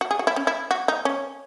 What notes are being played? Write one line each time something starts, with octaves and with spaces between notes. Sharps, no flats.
F#4
G#4
F#4
E4
C#4
E4
F#4
D#4
C#4